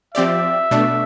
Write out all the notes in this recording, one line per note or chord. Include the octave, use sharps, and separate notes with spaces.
F3 C4 G4 D5 E5
B2 A3 D4